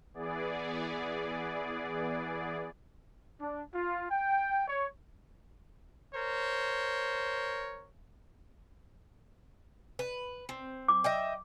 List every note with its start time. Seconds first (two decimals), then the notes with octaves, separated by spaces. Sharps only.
0.14 E3 B3 G#4 D5
3.40 D4
3.75 F4
4.11 G5
4.68 C#5
6.14 A#4 C5 C#5
9.99 B4
10.49 C4
10.88 D6
11.04 D#5 E5 G5